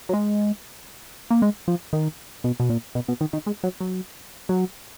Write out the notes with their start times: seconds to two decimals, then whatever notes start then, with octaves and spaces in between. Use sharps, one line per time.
0.09 F#3
0.13 G#3
1.31 A#3
1.42 G#3
1.68 F3
1.93 D#3
2.44 B2
2.60 B2
2.70 A#2
2.95 B2
3.08 B2
3.21 D#3
3.33 D#3
3.46 G#3
3.63 F#3
3.81 F#3
4.49 F#3